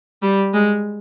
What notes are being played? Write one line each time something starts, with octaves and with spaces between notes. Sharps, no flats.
G3
G#3